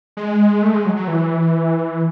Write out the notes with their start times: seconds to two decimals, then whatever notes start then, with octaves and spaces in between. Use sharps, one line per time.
0.17 G#3
0.63 A3
0.74 G#3
0.86 F#3
0.96 F#3
1.08 E3